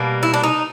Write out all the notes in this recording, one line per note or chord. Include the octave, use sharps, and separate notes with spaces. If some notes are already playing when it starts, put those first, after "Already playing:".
Already playing: B2 G3 A#3
E4
D4
D#4